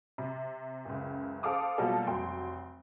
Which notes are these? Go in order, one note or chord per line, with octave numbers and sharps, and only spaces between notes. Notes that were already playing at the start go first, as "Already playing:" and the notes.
C3
F#1 C#2
A4 C5 F5 D6 D#6
B2 F#3 G3 A#3 F4 A4
F1 F#3 G5 C6